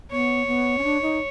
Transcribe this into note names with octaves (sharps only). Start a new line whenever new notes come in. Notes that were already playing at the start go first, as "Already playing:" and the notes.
B3 C#5
B3
C#4
D4
D#4